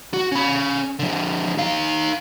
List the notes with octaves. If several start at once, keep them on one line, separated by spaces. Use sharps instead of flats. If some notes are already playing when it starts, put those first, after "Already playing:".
F#4
C#4 B5
D3 F3
D#4 F5